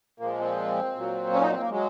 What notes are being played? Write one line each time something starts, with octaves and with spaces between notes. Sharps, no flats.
A#2 F3 G#3 A#3
C4
A#2 F#3
C#4
D#4
C4
A#3
F#3 G#3